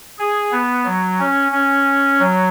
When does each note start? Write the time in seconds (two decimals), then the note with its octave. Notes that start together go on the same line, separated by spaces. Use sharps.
0.19 G#4
0.52 B3
0.85 F#3
1.19 C#4
1.52 C#4
2.19 F#3